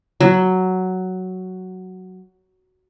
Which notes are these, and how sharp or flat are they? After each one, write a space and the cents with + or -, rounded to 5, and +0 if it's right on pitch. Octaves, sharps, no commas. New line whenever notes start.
F#3 +5